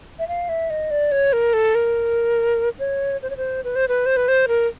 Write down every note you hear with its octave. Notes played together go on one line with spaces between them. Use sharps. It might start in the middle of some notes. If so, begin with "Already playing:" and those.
E5
F5
E5
D#5
D5
C#5
A#4
A4
A#4
C#5
C5
C#5
C5
B4
C5
B4
C5
B4
C5
A#4